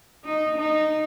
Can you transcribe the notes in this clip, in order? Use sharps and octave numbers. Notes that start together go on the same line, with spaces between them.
D#4
D#4